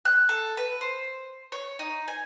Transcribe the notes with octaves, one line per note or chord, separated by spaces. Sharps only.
F#6
A4
B4
C5
C#5
D#4
G#5